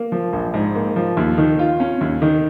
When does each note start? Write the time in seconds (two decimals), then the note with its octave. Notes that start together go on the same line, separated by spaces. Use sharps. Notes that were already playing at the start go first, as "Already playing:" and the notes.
Already playing: A#3
0.12 F3
0.33 A#1
0.54 G#2
0.75 A#3
0.96 F3
1.17 D#2
1.38 D#3
1.59 F4
1.80 C#4
2.01 D#2
2.22 D#3